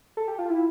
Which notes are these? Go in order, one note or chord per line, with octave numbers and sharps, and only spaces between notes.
A4
G4
F4
E4